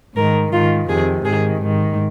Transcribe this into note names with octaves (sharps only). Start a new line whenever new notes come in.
G#2 D#3 A#4
G#2 D#3 F4
F2 C3 D#3 G#4
G#2 D#3 G#4
G#2 D#3